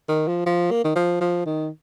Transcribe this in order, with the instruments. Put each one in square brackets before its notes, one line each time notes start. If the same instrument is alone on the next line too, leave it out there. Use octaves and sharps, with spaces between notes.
[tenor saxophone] D#3
F3
F3
A#3
D#3
F3
F3
D#3